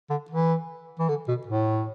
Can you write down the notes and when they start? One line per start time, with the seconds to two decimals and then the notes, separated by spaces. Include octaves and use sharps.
0.10 D3
0.30 E3
1.00 E3
1.09 D3
1.28 B2
1.47 A2